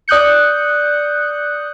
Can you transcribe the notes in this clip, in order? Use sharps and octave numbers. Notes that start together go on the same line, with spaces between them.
D5 D#6 F#6 G6 C#7